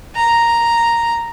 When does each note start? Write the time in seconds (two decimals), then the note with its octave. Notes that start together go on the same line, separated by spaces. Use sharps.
0.16 A#5